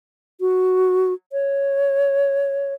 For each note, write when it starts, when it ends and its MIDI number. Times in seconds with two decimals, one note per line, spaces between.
0.41 1.13 66
1.32 2.74 73